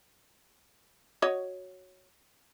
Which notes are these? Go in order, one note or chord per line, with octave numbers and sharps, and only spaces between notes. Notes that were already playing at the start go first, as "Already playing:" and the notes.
F#4 C#5 D#5